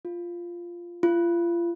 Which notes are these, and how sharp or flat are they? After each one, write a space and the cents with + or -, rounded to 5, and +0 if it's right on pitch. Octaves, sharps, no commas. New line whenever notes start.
F4 -5
F4 -35